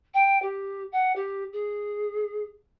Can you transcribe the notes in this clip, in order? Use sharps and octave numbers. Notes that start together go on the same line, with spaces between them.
G5
G4
F#5
G4
G#4